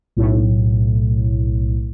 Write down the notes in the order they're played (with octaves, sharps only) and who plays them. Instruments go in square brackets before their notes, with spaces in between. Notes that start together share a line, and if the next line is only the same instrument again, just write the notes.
[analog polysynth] B1 A2